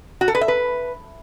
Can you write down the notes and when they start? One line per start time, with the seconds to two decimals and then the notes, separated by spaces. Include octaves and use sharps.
0.21 F#4
0.28 A4
0.35 B4
0.41 E5
0.48 B4